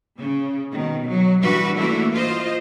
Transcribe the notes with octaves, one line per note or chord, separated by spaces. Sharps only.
C#3
B2 D#3
F#3
E3 G3 D4 F#4 B4
E3 A3 A#3 D4 E4 F#4
F4 C5 D#5